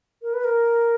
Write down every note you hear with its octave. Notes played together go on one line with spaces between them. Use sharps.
A#4
B4
A#4